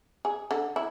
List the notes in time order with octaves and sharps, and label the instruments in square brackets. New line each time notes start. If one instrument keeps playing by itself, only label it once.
[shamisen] G#4
D3
E4